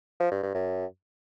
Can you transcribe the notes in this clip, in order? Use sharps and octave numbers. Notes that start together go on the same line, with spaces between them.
F3
G2
G2
F#2